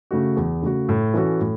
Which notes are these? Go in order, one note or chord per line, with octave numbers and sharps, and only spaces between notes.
C#3 A3 F#4
E2
C#3 A3 F#4
A2
E3 C#4 F#4 A4
A2